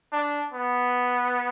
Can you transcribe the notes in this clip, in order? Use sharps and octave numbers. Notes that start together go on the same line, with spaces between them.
D4
B3